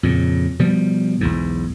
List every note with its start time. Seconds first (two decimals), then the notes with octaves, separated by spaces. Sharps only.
0.03 F2 A#2 C#3
0.59 B2 F3 G3
1.21 B1 E2 G#2